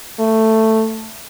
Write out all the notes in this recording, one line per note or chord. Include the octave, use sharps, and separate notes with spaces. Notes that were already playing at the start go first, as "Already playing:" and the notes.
A3